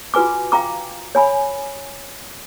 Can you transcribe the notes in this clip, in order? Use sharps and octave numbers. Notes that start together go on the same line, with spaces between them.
F4 F#4 B4 G#5 D6
F5 G5 A#5 D6
C#5 G#5 B5